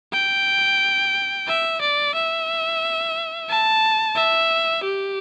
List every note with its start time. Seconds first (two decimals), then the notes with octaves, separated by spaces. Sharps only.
0.13 G5
1.48 E5
1.81 D5
2.14 E5
3.49 A5
4.16 E5
4.84 G4